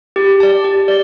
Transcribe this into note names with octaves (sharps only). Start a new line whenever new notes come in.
G4
D5 A5
G4
D5